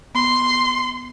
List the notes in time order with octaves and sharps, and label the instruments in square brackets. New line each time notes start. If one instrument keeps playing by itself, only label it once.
[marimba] B3 [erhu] C6